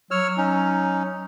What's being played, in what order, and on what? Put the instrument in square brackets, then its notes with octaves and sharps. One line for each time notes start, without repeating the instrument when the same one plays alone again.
[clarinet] F#3 [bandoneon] C#5 E6 F6
[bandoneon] C#4 D#4